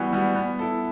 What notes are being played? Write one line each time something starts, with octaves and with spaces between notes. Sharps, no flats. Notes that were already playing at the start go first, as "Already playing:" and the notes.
Already playing: E3 G3 B3 F#4
G3 B3 F#4
B3
E4 A4